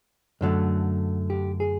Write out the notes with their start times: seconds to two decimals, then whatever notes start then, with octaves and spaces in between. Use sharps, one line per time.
0.41 F#2 D3 F#3 A3
1.30 G4
1.60 G#4